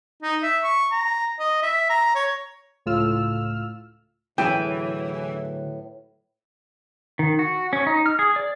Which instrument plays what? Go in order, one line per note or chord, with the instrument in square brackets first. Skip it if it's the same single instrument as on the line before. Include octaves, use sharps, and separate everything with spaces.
[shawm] D#4
E5
C#6
A#5
D#5
E5
A#5
C#5
[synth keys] C#2 A2 F4 E6 F6
[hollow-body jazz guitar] D2 F#3 G#4 [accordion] A2 [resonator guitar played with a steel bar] E3 [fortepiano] G5
[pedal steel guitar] D#3
F#4
C#4
D#4
F6
G#4
D5